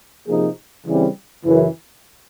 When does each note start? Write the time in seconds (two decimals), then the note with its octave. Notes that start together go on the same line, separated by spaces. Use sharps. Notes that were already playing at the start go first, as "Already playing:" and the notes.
0.27 C3 F3 A#3 D#4 G#4
0.86 C#3 E3 G3 C4
1.45 F#2 C#3 E3